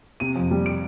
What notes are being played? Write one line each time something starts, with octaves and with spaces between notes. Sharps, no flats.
C3 D#7
F2
G3
D7